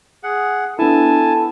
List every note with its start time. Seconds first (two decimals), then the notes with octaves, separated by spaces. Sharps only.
0.23 G#4 F#5
0.79 B3 D4 E4 A4 G#5 A5